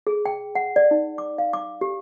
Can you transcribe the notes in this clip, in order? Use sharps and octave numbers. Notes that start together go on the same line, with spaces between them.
G#4
G5
F#5
D5
D#4
D6
F5
D6
G4